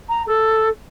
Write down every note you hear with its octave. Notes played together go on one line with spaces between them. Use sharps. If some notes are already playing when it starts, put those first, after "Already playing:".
A#5
A4